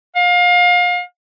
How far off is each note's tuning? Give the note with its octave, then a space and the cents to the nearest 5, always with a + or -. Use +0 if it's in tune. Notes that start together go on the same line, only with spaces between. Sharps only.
F5 +30